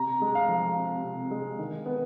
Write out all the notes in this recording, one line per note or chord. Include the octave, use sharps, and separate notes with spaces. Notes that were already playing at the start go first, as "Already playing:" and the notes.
Already playing: C3 A#5
G#3
F5
F3
C3
C3
G#3
D#3
B3